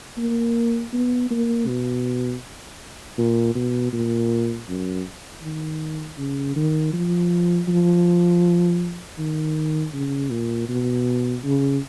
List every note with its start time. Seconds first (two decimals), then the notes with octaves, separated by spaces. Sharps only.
0.18 A#3
0.93 B3
1.30 A#3
1.67 B2
3.18 A#2
3.55 B2
3.93 A#2
4.69 F#2
5.43 D#3
6.18 C#3
6.56 D#3
6.93 F3
7.68 F3
9.18 D#3
9.94 C#3
10.31 A#2
10.69 B2
11.44 C#3